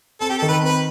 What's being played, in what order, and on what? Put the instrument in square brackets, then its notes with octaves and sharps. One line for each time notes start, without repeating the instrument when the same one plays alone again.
[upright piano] C4 [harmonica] A4
[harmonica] G4
A4
[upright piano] D#3
[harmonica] B4
[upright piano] C4 [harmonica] B4